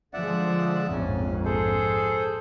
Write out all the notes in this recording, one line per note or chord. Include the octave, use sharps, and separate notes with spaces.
D3 F3 G#3 D5 E5 F#5
A#1 F2 G#2 C#4
G#4 A4 C5